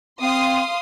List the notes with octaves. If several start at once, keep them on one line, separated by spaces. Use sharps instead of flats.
C4 F5 C6 D#6